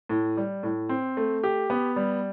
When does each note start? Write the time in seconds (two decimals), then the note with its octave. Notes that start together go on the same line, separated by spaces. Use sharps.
0.09 A2
0.37 G3
0.63 A2
0.89 C4
1.17 A3
1.43 G4
1.70 B3
1.96 G3